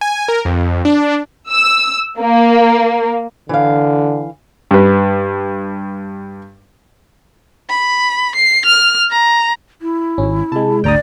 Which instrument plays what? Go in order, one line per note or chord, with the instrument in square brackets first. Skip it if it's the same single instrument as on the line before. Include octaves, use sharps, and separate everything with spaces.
[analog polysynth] G#5
A#4
F2
D4
[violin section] E6
A#3
[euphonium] D3 [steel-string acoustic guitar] E3 F5
[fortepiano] G2 B4
[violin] B5
C7
F6
A#5
[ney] E4
[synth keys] G#1 [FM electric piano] C#4
[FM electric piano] C3 G#3 [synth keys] A5
[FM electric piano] G#1 D2 G4 [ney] D5 [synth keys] G5 A#5 D#6